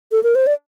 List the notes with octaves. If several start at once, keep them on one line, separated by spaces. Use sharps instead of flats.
A4
A#4
C5
D5